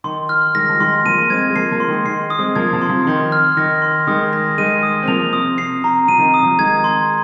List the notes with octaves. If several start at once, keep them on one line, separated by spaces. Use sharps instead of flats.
D#3 C6
F6
D#3 G#3 A#6
F3
D#3 G#3 C6
F3 A#3 D#7
G#3 C4 G#6
G#3
F3 A#3 C7
F3 A#3
C6
D#3 G#3
D#3 C7
D#6
G#3 C4
F3 A#3 G#6
C3 F3
C6
C3 F3
D#3 C6
F6
D#3 A#6
C6
D#3 G#3 D#6
A#6
D#3 G#3 D#7
D#6
C4
F3 A#3 F7
C3 D#6
C3 C7
C3 A#5
C3 F3 D#7
D#3
C3
D#6
C3 F3
D#3 G#3 G#6
C6